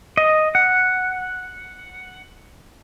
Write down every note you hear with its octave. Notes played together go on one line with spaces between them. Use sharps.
D#5
F#5